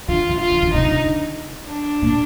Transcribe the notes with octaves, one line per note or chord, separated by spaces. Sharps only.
D3 F4
D3
F4
D#3
D3
C3 D#4
D3
D4
A#2